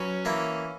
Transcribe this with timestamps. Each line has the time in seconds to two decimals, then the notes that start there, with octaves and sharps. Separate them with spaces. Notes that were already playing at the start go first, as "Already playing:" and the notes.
Already playing: F#3 C#4 B4
0.25 E3 A#3 E4